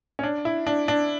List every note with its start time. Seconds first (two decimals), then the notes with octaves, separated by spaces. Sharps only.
0.19 C#4
0.23 D4
0.45 E4
0.67 D4
0.88 D4